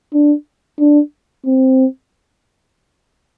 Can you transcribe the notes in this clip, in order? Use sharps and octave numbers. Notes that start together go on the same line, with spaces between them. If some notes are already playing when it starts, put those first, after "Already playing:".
D4
D4
C4